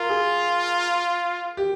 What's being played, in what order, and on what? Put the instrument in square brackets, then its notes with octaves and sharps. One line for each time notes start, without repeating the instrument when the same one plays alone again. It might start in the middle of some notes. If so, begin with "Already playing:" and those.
Already playing: [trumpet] F4 [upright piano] A#4
[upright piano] G#4
G4